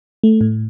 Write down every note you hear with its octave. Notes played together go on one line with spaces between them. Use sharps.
A3
A2